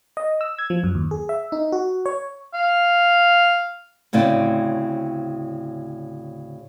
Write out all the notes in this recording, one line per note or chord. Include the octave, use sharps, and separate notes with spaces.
D#5
E6
G#6
F3
F#2
D#2
G#4
E5
D#4
F#4
C#5
F5
D2 A2 C#3 C4 D5